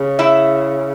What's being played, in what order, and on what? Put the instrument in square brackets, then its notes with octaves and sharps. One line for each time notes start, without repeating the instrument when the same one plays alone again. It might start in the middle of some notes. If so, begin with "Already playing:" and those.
Already playing: [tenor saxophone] C#3
[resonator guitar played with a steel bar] E4 E5